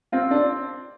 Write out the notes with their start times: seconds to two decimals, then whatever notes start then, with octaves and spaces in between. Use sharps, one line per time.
0.12 C4 F4
0.31 D4